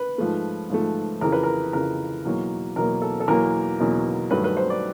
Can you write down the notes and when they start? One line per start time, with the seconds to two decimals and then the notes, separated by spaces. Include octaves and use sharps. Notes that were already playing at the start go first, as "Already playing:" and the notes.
Already playing: B4
0.18 G#2 F3 A3
0.70 G#2 F3 A3
1.21 F2 C#3 E3 A#4
1.32 B4
1.43 A#4
1.73 F2 C#3 E3 A#4
2.25 E2 B2 F#3 A#3
2.76 E2 B2 F#3 A#3 A#4
3.02 A4
3.20 A4
3.28 E2 B2 F#3 A#3 A#4
3.80 E2 B2 F#3 A#3
4.31 G2 D#3 F#3 A3 B4
4.44 B4
4.57 C5
4.70 D5